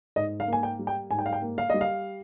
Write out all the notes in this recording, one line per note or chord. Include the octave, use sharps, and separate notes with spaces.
G#2 D#5
F5
A#3 G#5
G5
G3
G5
G#2 G#5
G5
F5
G5
A#3
F5
G3 D#5
F5